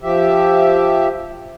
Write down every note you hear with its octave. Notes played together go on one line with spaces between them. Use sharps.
F3 G4 E5